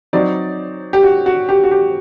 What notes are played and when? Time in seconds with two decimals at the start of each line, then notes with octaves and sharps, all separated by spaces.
0.13 F#3 C4 D#4 D5
0.93 G4
1.03 F#4
1.26 F#4
1.49 G4
1.64 F#4
1.71 G4